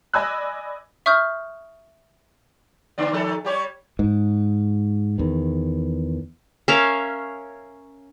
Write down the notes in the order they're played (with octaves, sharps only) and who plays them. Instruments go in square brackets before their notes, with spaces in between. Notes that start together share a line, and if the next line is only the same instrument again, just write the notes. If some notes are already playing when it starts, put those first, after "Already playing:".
[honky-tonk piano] D5 D#5 G#5 B5 E6 F#6
[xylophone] E5 C#6 D#6 F6 G6
[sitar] D3 B3 D5
D#3 F3 A4
G3 G4 C#5
[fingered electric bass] G#2
E2 D#3
[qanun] C#4 A#4 E5 F5